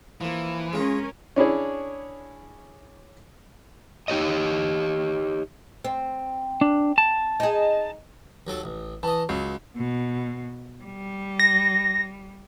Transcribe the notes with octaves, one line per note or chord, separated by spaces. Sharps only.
E3 F3 A#3
G#3 C#4 F4 G#4 A#4
C#4 D4 E4 G#4 C#5
D#4 G4 C#5 D#5
C4
D4
A5
D#4 G#4
D#2 F#3 A4
A1
E3 D#5 A5
C#2 F#3
B2
G3
A#6